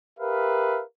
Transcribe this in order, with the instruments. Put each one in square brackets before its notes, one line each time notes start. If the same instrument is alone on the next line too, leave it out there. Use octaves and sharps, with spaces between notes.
[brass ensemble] G4 A#4 B4 E5 F5